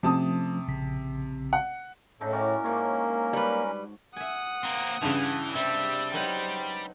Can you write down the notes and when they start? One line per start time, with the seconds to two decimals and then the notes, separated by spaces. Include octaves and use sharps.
0.03 C3 F3 A3 C#4 A5 D#6
0.68 A#1 C#3 B6
1.53 F#5
2.21 A2 C#3 D4 D#4 A4
2.32 C#4 E4 F#4 A#4 D5
2.64 G#2 A#3 D4 C#5
3.33 G3 B4
4.16 E5 F#5 G#5 D#6
4.63 A#3 C4
5.02 G2 C#3 E3
5.55 C3 G3 E6
6.14 F#3 D#4 B4 C5 G5